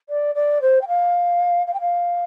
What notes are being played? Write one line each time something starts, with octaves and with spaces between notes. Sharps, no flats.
D5
D5
C5
G5
F5
F5
G5
F5